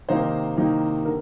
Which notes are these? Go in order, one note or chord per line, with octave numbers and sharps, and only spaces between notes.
C3 D#3 A#3 D#4 C5
C3 D#3 A#3 D#4
D3 A#4